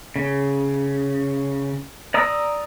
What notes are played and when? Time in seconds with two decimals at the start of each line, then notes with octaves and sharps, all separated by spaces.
0.16 C#3
2.14 D5 A#5 D#6 E6